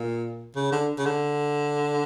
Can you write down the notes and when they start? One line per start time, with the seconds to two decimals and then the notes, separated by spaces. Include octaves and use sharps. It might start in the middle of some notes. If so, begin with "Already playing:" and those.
Already playing: A#2
0.55 C#3
0.72 D3
0.98 C#3
1.06 D3